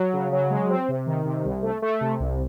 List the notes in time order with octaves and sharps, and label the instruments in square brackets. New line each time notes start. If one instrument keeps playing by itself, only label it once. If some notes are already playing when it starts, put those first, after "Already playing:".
Already playing: [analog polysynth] F#3
C#3
F#3
G#3
C4
C3
D#3
C3
C2
A3
A3
C3
C2